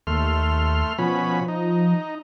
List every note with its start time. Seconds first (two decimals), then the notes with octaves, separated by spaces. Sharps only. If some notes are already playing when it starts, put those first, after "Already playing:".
0.07 D#2 A3 C6 F6
0.98 B2 F3 C#4 B5
1.48 D#4